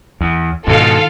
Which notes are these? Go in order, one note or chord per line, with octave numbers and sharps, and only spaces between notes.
E2
G#2 B2 D#3 F4 A4 F5